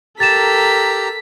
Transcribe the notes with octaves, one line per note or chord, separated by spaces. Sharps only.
G4 A4 A#4 A#5 A6 B6 E7